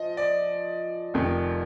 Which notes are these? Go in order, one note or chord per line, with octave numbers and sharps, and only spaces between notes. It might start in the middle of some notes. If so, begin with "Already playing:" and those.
Already playing: F3 D#5
D5
F1 F2 D#3